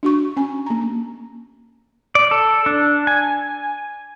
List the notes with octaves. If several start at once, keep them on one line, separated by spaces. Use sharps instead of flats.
D4 F#4 C#6
C#4 G#5
A#3 A#5
D5
A4
D4
G#5